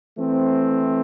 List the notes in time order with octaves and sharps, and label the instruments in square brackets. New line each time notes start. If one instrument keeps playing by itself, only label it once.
[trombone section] E3 A3 C4